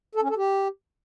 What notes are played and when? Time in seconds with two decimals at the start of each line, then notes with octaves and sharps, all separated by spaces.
0.15 A4
0.22 C#4
0.30 A4
0.37 G4